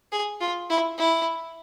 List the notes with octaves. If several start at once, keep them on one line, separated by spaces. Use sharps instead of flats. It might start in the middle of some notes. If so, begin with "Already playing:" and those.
G#4
F4
E4
E4